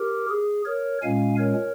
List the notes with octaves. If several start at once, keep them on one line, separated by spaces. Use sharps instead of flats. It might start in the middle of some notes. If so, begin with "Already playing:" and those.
Already playing: G4 A#4
G#4
A#4 C#5
A#2 G#3 C#4 F5 G#5
A#4 C#5